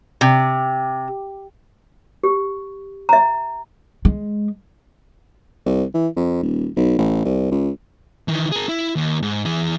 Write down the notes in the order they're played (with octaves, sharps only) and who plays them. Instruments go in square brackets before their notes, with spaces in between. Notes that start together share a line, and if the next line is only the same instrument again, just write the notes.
[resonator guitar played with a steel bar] C3
[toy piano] G4
E5 A#5
[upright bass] G#3
[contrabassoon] C2
E3
F2
D#1
B1
A1
C2
C#2
[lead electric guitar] D#3 E3
G#4 A#4
E4
D#2
G#2
E3 G#4